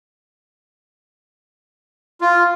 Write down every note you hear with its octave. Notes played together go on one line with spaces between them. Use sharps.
F4